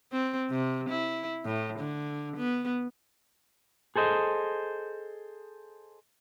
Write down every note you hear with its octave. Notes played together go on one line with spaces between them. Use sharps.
C4
C3
E4
A2
D3
B3
G#4 A4 C5 D#5